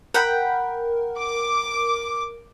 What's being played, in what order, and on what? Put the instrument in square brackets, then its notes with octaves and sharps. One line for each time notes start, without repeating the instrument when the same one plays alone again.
[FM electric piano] A#4 [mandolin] F#5 G5 B5
[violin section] D6